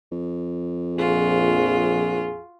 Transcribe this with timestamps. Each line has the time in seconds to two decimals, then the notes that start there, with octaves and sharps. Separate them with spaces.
0.12 F2
0.97 A#1 F4 F#4 G#4